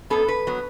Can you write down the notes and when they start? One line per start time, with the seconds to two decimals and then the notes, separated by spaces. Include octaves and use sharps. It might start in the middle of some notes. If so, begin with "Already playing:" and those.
0.10 F#2 F#3 B3 A4
0.28 B4
0.47 F#3 B3